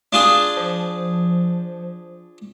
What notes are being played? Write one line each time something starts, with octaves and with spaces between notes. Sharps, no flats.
D4 F4 G#4
F3